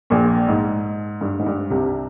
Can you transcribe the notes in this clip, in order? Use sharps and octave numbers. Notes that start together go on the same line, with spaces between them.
A#1 A#2
G#2
G2
G#2
G2
C2 C3